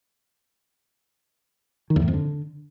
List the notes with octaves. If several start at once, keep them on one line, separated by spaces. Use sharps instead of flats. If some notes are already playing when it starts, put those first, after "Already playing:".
D#3
E2
A2
F2
D3